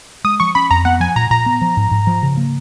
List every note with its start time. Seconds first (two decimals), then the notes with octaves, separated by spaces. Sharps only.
0.24 G#3 D#6
0.40 F3 C#6
0.55 C#4 B5
0.70 F2 A#5
0.85 B3 F#5
1.00 F3 G#5
1.16 A#2 A#5
1.30 A#2 A#5
1.46 B3
1.61 F3
1.77 G#2
1.91 G#2
2.07 F3
2.23 C#3
2.37 A#3